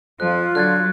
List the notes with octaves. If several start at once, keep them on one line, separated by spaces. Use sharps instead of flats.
F2 F3 F4 F#6
D3 F#3 F#6 G#6 A6